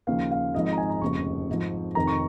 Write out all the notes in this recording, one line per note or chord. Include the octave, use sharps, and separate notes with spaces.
D#2 C#3 F3 F5
F5
G#1 G#2 F3 D#5
A#5
G#5
A#5
F1 D#2 C#3 F3 C#6
G#1 G#2 F3
F1 F2 D#3 A#5
C#6